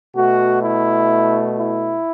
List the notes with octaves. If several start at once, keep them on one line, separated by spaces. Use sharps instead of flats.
B2 A3 F#4
E4
E4